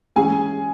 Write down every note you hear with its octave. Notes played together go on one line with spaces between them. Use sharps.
E3 G#3 C#4 G#4 G#5